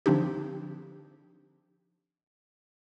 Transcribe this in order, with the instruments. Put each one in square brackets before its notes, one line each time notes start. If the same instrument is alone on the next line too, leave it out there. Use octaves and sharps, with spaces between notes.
[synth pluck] D3 F3 C4 D4 D#4 G4